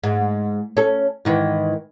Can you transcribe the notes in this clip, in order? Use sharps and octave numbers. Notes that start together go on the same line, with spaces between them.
G#2
C#4 A4
G#2 D#3 E3